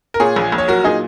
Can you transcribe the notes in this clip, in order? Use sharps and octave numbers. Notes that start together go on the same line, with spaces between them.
A#4
A#2 G#4 C#5
A#1
A#1
C#5
F#3 F#4 A#4
A#2 D#4 G#4